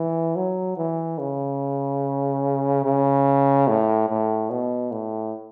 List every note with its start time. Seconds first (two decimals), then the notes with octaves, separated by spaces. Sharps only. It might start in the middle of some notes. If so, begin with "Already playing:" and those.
Already playing: E3
0.36 F#3
0.77 E3
1.19 C#3
2.84 C#3
3.68 A2
4.09 A2
4.50 B2
4.92 A2